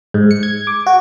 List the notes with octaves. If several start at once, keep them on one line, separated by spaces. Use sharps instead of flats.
G#2
C#7
G#6
D6
F#4